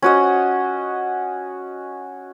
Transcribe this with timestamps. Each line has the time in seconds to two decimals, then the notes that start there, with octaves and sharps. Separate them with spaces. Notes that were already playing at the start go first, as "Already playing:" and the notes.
0.02 C#4 F#4 D#5